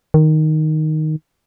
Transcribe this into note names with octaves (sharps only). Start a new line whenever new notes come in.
D#3